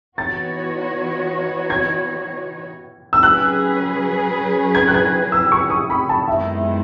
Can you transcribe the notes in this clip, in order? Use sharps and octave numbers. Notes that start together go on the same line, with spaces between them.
E3 B3 D#4 F#4 C#5 A6
G#6
E6
F#3 C#4 G#4 B4 F#6
G#6
F#6
G#6
E6
C#6
D#6
B5
A5
F#2 D#3 G#3 B3 E4 E5